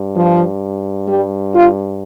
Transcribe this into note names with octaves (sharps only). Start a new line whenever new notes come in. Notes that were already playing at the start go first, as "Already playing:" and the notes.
Already playing: G2
F3
G3
F4